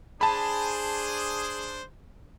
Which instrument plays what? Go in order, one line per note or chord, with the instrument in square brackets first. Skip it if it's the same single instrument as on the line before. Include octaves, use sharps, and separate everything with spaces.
[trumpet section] D4 C5 [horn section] G#4 [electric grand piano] A5 B5